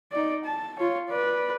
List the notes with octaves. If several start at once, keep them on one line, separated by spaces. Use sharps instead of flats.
D#4 D5
A5
F4 C#5
B4 D5